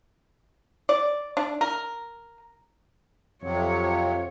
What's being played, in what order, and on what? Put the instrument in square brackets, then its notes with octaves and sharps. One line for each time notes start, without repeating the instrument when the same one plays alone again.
[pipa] D5
D4
A#4
[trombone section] F2 [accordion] C3 F#3 [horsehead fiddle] C#5